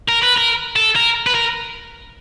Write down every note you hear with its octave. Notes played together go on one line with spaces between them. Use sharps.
A#4
B4
A#4
A4
A#4
B4
A#4